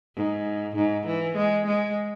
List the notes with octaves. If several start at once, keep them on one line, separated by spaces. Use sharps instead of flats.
G#2
G#2
E3
G#3
G#3